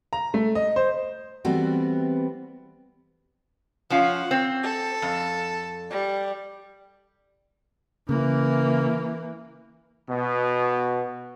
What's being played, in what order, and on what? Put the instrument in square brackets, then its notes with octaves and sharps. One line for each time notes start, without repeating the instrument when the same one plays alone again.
[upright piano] A#5
A3
D#5
C5
[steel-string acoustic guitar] E3 G3 A3 B3 C4 F#4
[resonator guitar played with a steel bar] F3 C#4 F4 [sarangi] F#5
[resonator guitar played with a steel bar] C4
[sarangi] A4
[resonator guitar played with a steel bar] F2
[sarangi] G3
[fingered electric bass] C#3 [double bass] E3 A#3
[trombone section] B2